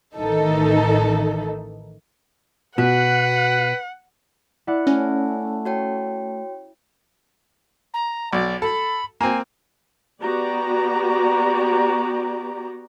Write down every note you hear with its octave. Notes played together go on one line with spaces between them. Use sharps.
A1 D#3 E3 D#4 A4
B2 F#4 B4 F#5
E4 D5 F#5
A3 C#4 G#5 A#6
F#4 C#5 G5
A#5
B1 D5
A4 B5
A#3 C4 G#5
B3 F#4 G4 D5 A#5